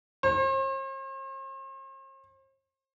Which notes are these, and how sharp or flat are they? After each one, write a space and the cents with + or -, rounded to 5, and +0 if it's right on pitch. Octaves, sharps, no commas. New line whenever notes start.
C5 +45